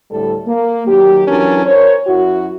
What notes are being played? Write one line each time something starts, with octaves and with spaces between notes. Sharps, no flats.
D2 A2 G3 A4
A#3
D#3 F#3 G4
E3 F#3 C#4 D4 A#4
A#4 C5 C#5
F#2 E4 F#4